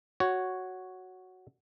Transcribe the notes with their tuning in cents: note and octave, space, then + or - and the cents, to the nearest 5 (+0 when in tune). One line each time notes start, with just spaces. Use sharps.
F#4 +0 C#5 +0